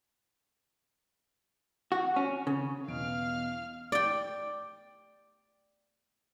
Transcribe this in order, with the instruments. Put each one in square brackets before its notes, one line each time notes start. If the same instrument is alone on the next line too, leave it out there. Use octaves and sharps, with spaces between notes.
[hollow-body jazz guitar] F#4
C#4
C#3
[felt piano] E2 B2 D7 [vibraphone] B3 [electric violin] F5 F6
[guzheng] D5 G5